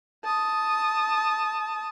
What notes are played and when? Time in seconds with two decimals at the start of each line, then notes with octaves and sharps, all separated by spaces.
0.24 A5 D#6